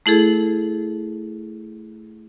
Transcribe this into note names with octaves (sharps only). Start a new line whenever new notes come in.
A3 E4 G#4 A4